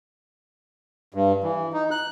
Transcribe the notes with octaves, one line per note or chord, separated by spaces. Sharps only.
G2
E3
D#4
F#6